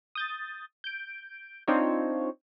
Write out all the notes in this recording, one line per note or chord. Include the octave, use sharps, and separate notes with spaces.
D#6 G6 A6
G6 D7
C4 D4 D#4 F4 C5 C#5